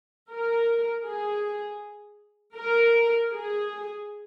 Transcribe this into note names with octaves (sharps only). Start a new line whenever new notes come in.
A#4
G#4
A#4
G#4